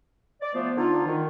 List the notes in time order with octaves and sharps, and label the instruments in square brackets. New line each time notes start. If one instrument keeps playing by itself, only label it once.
[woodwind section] D5
F3 A3 B3 C5
D3 D#4 F4
D#3